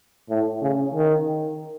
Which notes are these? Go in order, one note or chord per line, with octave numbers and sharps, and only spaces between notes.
A2
C#3
D#3